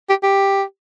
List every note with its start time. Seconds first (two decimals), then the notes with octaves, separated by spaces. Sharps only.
0.09 G4
0.23 G4